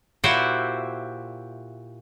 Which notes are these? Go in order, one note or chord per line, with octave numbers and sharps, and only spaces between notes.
A#2 E4 F#4 G4 C5 E5